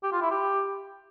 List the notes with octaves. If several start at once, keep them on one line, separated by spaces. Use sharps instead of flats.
G4
F4
E4
G4